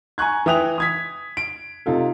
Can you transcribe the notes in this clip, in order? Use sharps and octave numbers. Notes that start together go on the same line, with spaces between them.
G#5 A#5 C#6 F#6 G#6
E3 E5 G5 D#6 F#6 F7
D#6 G#6 B6
D7
C3 D#4 F4 A4